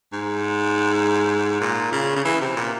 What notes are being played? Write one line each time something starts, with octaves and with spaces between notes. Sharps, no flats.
G#2
A#2
C#3
C#3
E3
C3
A#2